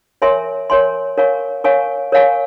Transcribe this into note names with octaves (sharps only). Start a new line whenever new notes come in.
A#4 C#5 E5 G#5 C6
A#4 C#5 E5 G#5 C6
A#4 C#5 F5 G#5 C#6
A#4 C#5 F5 G#5 C#6
A#4 C#5 F5 G#5 C#6